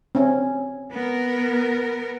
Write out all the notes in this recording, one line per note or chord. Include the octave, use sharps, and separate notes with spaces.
C4 C#4
B3 A#4